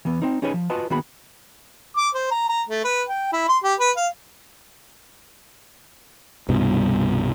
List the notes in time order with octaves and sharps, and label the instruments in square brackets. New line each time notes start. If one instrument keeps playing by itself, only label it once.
[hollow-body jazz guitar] E3 B3
C4 D#4
C#4 D#4 G#4 B4 C#5 G#5
F3
F4 F#4 B4 D#5 G#5 A5
D#3 A#3 B3 F#4 G#4 B5
[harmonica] D6
C5
A#5
A#5
A3
B4
G5
E4
C6
G4
B4
F5
[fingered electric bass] C2 G2 B2